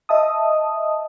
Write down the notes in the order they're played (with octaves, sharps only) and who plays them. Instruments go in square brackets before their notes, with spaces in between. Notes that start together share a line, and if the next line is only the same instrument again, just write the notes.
[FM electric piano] D#5 E5 A5 D#6